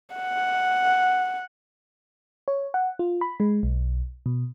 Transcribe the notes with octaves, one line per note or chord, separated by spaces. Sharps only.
F#5
C#5
F#5
F4
B5
G#3
B1
B2